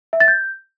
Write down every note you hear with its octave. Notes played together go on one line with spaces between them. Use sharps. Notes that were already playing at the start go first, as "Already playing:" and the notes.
E5
A6
G6